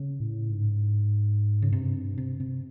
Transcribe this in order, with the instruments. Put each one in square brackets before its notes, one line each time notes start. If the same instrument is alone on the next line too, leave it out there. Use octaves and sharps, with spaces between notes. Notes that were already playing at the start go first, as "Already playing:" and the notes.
Already playing: [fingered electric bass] C#3
[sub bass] A2
G#2
[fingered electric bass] C#3
[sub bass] G2 [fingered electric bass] C3
[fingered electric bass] C3
C3